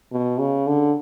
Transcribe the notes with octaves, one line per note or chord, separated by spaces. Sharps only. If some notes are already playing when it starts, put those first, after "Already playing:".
B2
C#3
D3